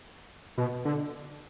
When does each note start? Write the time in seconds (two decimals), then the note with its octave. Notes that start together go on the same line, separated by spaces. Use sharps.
0.58 B2
0.85 D3